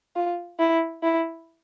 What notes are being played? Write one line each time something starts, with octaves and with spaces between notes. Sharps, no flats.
F4
E4
E4